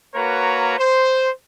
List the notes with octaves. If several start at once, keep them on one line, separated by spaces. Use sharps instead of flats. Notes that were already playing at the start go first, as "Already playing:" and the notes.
A#3 F#4 A#4 B4 C#5 A#5
C5